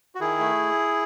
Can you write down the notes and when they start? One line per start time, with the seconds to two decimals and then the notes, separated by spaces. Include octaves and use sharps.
0.15 F#4
0.20 D#3 E4 G#4
0.39 A3